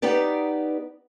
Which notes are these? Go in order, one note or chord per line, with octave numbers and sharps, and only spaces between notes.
B3 D#4 G4 B4 D5